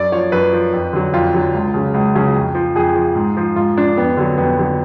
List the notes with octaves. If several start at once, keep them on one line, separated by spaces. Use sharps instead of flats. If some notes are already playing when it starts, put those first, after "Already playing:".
Already playing: F#2 D5
F3 C#5
F#2 B4
F3
F2
D3 F#3
F2 F4
D3 F#3
C#2
C#3 F#3
C#2
C#3 F#3
F2
F3
F2 G#4
F3
G#2
F3
G#2 F4
F3 D4
F2 B3
D3 F#3
F2 B3
D3 F#3